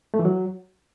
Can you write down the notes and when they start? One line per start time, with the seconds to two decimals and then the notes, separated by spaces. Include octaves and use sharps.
0.14 A3
0.19 E3
0.25 F#3